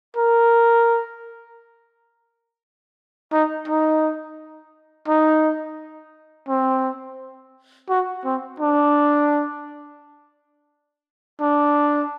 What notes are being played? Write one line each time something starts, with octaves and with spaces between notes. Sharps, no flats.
A#4
D#4
D#4
D#4
C4
F#4
C4
D4
D4